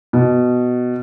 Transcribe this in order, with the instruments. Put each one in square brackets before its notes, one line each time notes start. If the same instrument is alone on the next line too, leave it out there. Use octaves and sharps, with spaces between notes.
[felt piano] B2